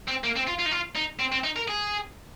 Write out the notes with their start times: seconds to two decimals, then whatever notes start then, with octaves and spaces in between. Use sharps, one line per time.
0.08 C4
0.24 A#3
0.36 C4
0.48 F4
0.59 F4
0.66 D#4
0.72 F4
0.96 D#4
1.20 C4
1.32 C4
1.44 D#4
1.56 A#4
1.68 G#4